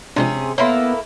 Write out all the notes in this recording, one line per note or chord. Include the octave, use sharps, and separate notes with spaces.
C3 F3 G#3 C#4 D4 G#4
A#3 B3 E4 A4 C#5 B5 C6